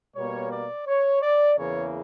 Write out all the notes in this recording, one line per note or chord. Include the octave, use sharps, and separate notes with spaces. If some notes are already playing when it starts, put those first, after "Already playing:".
B2 G3 A#3 C#5
D5
C#5
D5
E2 C#3 E3 A#3 C#5